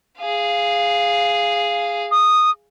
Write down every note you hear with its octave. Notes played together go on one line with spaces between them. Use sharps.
G#4 F5
D#6